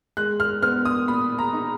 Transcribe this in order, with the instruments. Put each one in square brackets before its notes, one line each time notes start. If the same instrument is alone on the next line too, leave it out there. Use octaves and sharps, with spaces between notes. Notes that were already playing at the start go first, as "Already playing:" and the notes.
[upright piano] G#3 F#6
F6
B3 F6
D#6
A#2 B5
A#5
D#4